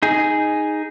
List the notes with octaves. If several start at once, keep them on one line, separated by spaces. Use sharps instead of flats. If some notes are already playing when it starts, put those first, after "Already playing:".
D#4 G#4